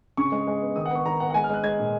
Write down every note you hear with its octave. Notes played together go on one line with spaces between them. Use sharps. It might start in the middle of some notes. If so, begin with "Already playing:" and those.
C#3 C#6
G#3
G#3
B3
D#3 D#6
F#5
B3
C#6
D#3 A#5
B3 F#5
F#5
G#3 G#5
F6
G#3 F#6
G#3 G#6
A#2